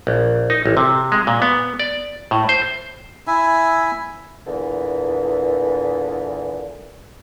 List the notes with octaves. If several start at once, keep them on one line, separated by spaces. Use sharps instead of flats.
A#1
D#4
A1
C3
G#3
A#2
B3
D5
A2
C5
E4 E5 G#5
E2 A#2 D3 E3